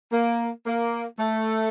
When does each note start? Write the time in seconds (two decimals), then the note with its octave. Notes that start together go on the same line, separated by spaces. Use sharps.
0.12 A#3
0.66 A#3
1.19 A3